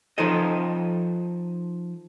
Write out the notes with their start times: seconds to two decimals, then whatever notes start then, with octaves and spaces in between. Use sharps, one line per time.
0.18 F3 D#4 F4 A4 D#5